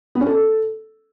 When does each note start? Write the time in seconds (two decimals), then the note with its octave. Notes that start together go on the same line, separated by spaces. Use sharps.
0.15 B3
0.21 C#4
0.27 A4